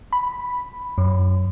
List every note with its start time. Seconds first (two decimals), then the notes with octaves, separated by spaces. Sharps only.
0.13 B5
0.98 F#2